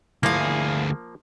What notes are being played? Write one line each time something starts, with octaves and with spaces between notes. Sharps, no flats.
D2 F3 A#3 E4 G#4 F5